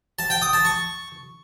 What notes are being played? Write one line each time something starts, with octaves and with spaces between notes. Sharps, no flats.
A5
G5
D#6
A5
C#6